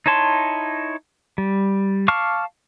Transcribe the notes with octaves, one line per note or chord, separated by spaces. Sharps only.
D#4 E4 C#5 A5 C6
G3
F5 A5 C#6 D6 F6